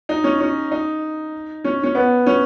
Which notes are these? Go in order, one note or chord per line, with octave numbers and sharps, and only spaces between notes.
D#4
C#4
C#4
D#4
C#4
C#4
B3
C#4